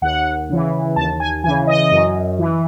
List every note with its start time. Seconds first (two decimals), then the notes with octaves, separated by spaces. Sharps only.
0.02 D#2 F#5
0.49 C#3 E3
0.96 D#2 A5
1.20 G#5
1.44 E3 G#5
1.48 C#3
1.67 D#5
1.91 F#2
2.39 E3